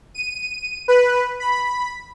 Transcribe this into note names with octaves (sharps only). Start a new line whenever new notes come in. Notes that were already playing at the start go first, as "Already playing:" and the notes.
D#7
B4
B5